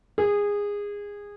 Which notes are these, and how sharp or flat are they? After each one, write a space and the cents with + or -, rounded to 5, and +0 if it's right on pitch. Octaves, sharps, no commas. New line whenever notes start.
G#4 -20